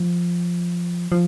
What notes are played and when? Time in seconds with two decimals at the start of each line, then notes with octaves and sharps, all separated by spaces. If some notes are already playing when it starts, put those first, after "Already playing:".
Already playing: F3
1.12 F3